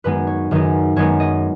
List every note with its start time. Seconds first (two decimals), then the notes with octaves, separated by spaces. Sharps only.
0.04 F#2 D#3 G#3 B3 D#4 B4
0.27 C#5
0.51 F#2 D#3 G#3 B3 D#4
0.96 F#2 D#3 G#3 B3 D#4 C#5
1.20 D#5